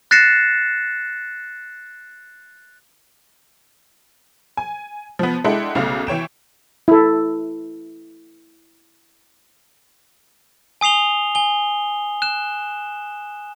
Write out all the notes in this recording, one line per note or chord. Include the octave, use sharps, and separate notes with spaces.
F#6 A6 A#6 C7 C#7 E7
G#5
F3 B3
G#3 D4 E4 A4 F#5 G5
B1 C#3 A3 F5
E3 C#5 G5 E7
E4 A4
G#5 D#6 C7 F7 G7
G#5 G7
F#6 E7